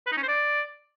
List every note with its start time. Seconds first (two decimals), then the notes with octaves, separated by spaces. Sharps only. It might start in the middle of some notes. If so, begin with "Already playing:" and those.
0.06 B4
0.12 D#4
0.17 C#4
0.23 C5
0.28 D5